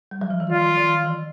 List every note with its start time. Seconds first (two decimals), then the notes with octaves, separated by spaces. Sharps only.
0.11 G3
0.21 F#3
0.30 F3
0.40 E3
0.50 D#3 F4
0.77 D#3
1.05 E3